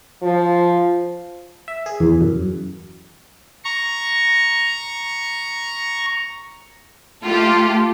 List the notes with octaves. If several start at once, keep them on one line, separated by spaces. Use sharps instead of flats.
F3
E5
G#4
E2
F#2
A#5 C#6
A3 F4 G4 A4